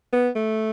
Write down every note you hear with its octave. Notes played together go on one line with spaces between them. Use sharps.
B3
A3